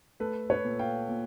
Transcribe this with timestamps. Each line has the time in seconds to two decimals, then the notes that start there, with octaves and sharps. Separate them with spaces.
0.20 A3 A4 B4
0.50 B4 C#5
0.65 A#2
0.79 F5 G5
1.09 A#2